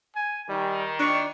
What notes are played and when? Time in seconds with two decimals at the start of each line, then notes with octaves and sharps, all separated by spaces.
0.16 G#5
0.49 D#3 G3
1.00 D4 D5 C#6